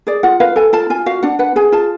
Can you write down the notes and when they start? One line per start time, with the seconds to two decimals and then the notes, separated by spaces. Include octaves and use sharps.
0.07 G#4 D5
0.23 F4 F#5
0.40 B4 F5
0.56 A4 G#5
0.73 F4 A5
0.90 F4 G#5
1.06 F#4 F5
1.23 D4 F#5
1.39 B4 F#5
1.56 G#4 G#5
1.72 F4 A5